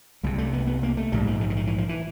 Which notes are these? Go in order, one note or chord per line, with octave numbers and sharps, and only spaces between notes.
C2 C3 G#3
A3
B3
B3
A#3
A3
A#1 G#2 G3
F3
D#3
D3
D#3
E3
F3
E3